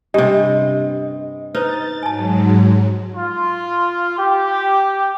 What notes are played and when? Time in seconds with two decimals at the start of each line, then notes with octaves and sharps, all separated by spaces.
0.14 G2 C3 C#4 D4 G4 D#5
1.55 D#4 B4 C5 A6
2.03 G#2 F#3 G#5 A5
3.15 F4
4.17 G4